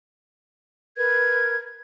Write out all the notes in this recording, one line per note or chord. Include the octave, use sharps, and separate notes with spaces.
A#4 B4 G#6